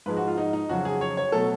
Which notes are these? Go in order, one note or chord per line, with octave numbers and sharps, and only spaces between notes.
G#2 F3 G#3 B4
F#4
F4
D#4
D#4
F2 C#3 F#3 F#4
G#4
C#5
C#5
B2 F#3 A3 A4